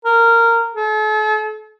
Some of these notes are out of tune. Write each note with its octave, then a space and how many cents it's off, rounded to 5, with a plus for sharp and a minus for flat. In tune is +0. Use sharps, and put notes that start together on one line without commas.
A#4 -15
A4 -40